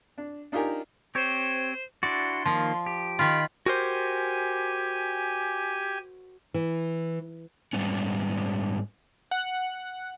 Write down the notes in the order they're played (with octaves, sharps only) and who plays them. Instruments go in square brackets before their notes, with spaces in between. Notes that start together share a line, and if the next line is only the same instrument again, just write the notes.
[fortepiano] D4
D4 D#4 F4 G4 A#4 G#5
[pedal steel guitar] C4 G4 C#5 [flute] C5
[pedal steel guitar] D4 E4 F#4 [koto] D5 [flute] C6
[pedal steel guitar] D#3 A#3 F4 [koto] F3
[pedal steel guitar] G4
[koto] D#3 F4 [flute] B5
[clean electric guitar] F#4 A#4 C5 [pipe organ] G4 G#5
[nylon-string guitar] E3
[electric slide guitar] G#2 C3 G3 B3 C#4
[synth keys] F#5